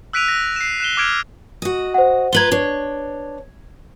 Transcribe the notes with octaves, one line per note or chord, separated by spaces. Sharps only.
E6 F#6 B6 D7 D#7 F7
A#6
C7 E7
F#6 E7 G7
D6 F6 G#6 D7 F7
F#4 D#5
C5 F#5
F4 B4 A#5 G#6 F#7 G7
D4 C#5